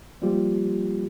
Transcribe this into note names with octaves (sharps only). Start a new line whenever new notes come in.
F3 G3 A#3 F4 G4